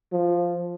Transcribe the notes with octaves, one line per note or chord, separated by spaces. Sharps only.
F3